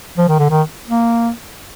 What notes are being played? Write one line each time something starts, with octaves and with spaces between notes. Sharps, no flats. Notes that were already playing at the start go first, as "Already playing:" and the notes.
F3
D#3
D3
D#3
A#3